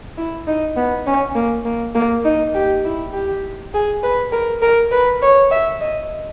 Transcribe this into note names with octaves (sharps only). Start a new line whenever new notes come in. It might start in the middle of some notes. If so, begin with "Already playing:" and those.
E4
D#4
B3
C#4
A#3
A#3
A#3
D#4
G4
E4
G4
G#4
B4
A#4
A#4
B4
C#5
E5
D#5